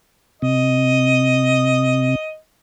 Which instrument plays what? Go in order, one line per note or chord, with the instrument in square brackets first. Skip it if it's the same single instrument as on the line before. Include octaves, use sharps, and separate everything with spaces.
[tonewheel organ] C3 [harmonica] D#5